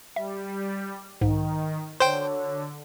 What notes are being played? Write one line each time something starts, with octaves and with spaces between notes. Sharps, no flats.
G3 E5
B1 G#2 D#3
D3 F#4 A4 C5 C#5 G5